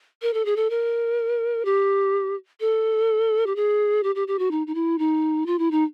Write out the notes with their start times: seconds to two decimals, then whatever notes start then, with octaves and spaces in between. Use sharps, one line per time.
0.22 A#4
0.34 A4
0.45 G#4
0.56 A4
0.70 A#4
1.65 G4
2.60 A4
3.46 G4
3.56 G#4
4.03 G4
4.15 G4
4.28 G4
4.39 F#4
4.51 D#4
4.67 D#4
4.75 E4
4.99 D#4
5.46 F4
5.59 E4
5.71 D#4